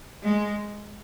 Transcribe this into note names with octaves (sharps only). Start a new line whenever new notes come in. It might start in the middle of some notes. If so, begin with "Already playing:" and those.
G#3